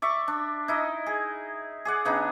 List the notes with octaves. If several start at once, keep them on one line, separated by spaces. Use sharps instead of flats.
D5 E5 C#6
D4
D#4 E4 D#5
G#4
G#4 D5 F#5
C#3 B3 D4 D#4